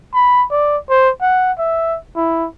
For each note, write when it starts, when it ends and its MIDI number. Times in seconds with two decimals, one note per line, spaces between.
0.14 0.44 83
0.51 0.77 74
0.90 1.10 72
1.21 1.52 78
1.59 1.98 76
2.16 2.47 64